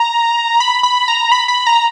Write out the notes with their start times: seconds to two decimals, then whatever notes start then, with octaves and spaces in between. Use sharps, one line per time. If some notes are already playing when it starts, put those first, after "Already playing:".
Already playing: A#5
0.60 B5
0.83 B5
1.08 A#5
1.32 B5
1.48 B5
1.67 A#5